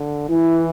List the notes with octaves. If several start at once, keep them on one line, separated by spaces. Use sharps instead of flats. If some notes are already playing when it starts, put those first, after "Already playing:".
Already playing: D3
E3 E4